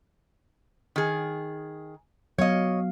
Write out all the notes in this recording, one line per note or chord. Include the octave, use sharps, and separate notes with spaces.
D#3 G#4
F#3 B3 C#5 D#5 F5